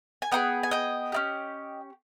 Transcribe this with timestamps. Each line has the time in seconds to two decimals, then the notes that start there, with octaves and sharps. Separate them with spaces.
0.22 G#5
0.32 B3 D#4 G#4 D#5 G5
0.63 G#5
0.71 D#5 G5
1.12 C#4 E4 G4